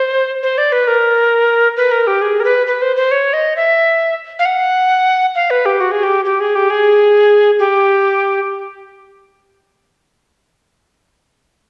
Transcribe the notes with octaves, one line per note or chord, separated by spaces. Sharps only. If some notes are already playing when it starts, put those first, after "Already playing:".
Already playing: C5
C5
D5
B4
A#4
B4
A#4
G4
G#4
A#4
B4
B4
C5
C5
C#5
D#5
E5
F5
F#5
F5
B4
G4
F#4
G#4
G4
G4
G#4
G4
G#4
G4